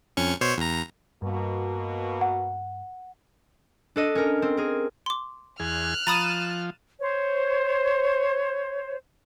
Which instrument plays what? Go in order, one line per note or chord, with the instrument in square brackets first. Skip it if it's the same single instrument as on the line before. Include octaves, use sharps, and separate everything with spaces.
[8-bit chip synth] F2 C#4 C#6
B2 C5 C#5
E2 A#5
[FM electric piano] G2 [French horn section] B2 A#3 F#4
[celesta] F#5
[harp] D4 A4 D#5
C#4 A#4
C4
G#4 A#4
[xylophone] C6 D6
[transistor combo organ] E2 G#4 [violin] F6 F#6
[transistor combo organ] F3 [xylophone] A#5 B5 D#6 [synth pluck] A6 D#7 E7
[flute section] C5 C#5